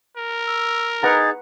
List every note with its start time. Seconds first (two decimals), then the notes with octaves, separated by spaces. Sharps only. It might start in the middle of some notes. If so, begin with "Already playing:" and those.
0.17 A#4
0.47 E6
1.03 D#4 G#4 B4 F#5 A#5 A6